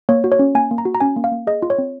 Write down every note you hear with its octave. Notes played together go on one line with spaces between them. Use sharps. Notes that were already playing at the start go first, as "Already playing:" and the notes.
A#3 C#5
F#4
C#5
C#4
A#3 G#5
A#3
A#5
F#4
A#5
C#4 G#5
A#3
F5
A#3
G#4 D#5
F4
C#5
C4